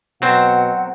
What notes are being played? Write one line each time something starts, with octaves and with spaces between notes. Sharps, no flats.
B2 F#3 C4 F#5